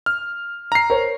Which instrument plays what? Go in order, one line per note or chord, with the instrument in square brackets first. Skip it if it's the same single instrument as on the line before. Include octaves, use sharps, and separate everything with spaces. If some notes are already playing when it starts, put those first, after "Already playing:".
[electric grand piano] F6
A#5 C7
[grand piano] A#4 C5 C#5